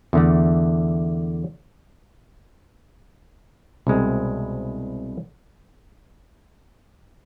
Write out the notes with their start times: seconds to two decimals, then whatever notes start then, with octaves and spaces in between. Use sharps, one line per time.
0.13 E2 D3 A3
3.87 C2 B2 G#3 C4